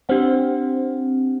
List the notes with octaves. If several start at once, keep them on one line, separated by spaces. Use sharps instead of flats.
C4 D4 G4 C5 F#5